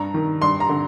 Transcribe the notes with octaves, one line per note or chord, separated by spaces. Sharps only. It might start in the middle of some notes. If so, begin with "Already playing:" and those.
Already playing: G2 A#5
D#3
G2 C6
A#5
D3